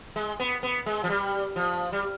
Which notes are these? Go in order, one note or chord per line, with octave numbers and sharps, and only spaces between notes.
G#3
B3
B3
G#3
F3
G3
F3
G3